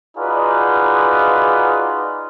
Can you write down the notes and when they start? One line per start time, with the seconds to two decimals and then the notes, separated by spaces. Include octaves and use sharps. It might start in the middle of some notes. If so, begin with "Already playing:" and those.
0.17 D#4 F4 F#4 G#4 B4 D5